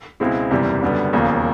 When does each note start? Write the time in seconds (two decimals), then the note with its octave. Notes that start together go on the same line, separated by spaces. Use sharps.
0.20 C#2 B2 G#3 C4 E4
0.51 F#1 E2 C3 E3 G3
0.82 F#1 F#2 D3 G3 B3
1.13 E1 D#2 C#3 F3 A#3